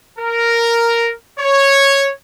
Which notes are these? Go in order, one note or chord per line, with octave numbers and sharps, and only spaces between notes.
A#4
C#5